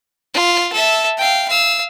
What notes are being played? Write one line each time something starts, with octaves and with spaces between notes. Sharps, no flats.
F4
A4 E5
F5 G5
F5 E6